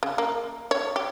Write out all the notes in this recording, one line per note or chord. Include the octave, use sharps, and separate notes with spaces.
C#3
A#3
C#5
G4